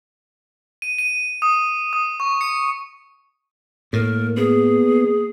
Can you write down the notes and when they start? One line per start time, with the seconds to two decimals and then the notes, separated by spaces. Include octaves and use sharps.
0.82 D#7
0.99 D#7
1.42 D#6
1.93 D#6
2.20 C#6
2.41 C#7
3.93 A2 A#3 A#4
4.37 B3 G#4